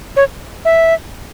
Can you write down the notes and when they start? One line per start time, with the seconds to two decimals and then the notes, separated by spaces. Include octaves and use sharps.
0.16 C#5
0.65 E5